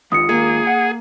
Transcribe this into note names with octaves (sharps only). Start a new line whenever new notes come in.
G#2 D#3 F4 D#6 C#7
A#3 G#4
F#5